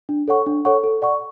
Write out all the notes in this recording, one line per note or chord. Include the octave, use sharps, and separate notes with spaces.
D4
A4 C#5 F#5 C#6
D4
A4 C#5 F#5 C#6
A4
D5 F#5 C#6